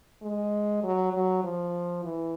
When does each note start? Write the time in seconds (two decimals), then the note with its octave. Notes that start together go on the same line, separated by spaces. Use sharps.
0.22 G#3
0.83 F#3
1.13 F#3
1.44 F3
2.04 E3